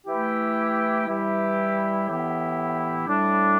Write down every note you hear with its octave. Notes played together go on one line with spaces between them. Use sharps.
E3 A3 E4 G4
E3 G3 E4 G4
A2 E3 B3 E4 G4
A2 G3 D4